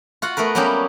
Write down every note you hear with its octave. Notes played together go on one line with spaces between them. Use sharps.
F4 F#4 F#5
A3 B3 A#4 B4
F#3 G3 A#3 B3 C#4 G4